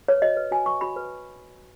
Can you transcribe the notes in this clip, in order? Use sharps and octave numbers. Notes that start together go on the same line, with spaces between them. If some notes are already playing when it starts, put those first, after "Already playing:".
B4 C#5
F#4 D#5
B4
F#4 G#5
B4 C#6
F#4 B5
B4